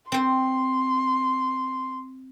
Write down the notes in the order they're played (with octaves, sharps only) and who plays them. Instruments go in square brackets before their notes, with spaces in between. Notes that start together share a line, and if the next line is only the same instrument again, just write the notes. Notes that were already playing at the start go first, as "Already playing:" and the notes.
[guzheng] C4 C5 [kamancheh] C6